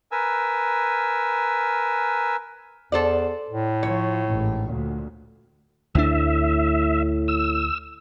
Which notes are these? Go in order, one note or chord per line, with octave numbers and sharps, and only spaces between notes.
A#4 B4 G#5 E6
E2 A4 C5 D5
A2
F3 C#5
A1 G#2
D2 A#2
D2 A2 D4 E5
E6